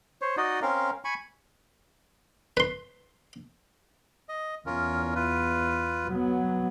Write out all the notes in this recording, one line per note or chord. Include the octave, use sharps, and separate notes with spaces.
C5 C#5
D#4 F#4 D5 D#5
C4 C#4 A#4 F5
G#5 B5 C#6
B4 C6
D#5
E2 C#4 F4 A#4
F4 B4
F#3 B3